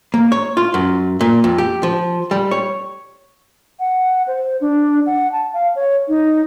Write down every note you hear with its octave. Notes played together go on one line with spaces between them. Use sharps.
A#3
C#5
F4
F#2
A#2
F2
G4
F3
G3
C#5
F#5
C5
D4
F#5
A5
F5
C#5
D#4